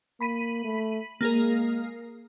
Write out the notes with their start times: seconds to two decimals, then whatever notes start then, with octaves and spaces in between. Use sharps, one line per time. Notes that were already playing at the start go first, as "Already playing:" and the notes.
0.21 A#3 B5 B6 D#7
0.65 A3
1.21 G#3 A#3 G#4 A#4